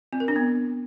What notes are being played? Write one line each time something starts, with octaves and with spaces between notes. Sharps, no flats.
C4
A#4
D4
B3